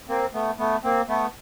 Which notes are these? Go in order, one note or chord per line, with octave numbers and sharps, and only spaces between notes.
A#3 C4
A3 B3
A3 B3
A#3 C4
A3 B3